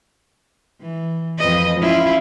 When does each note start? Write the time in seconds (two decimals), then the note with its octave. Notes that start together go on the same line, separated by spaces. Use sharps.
0.81 E3
1.38 F2 B4 D#5
1.79 C#4 E4 F4